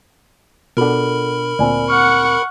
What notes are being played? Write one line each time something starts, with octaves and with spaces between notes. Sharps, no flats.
B2 D4 F4 A4 A#4 F#5 B5
D2 A#2 C4 D5 G#5
F#5 C#6 F6